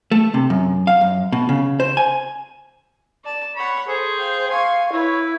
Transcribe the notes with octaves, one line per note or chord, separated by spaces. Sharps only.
A3
C3
F#2
F5
F#2
B2
C#3
C5
G#5
D5 A5
C#5 F#5 B5
G#4 A4 C5
F5 G5
F5 G#5 C6 C#6
E4 B4 C#5